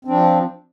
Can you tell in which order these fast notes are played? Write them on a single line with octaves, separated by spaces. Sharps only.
C4 D4 F3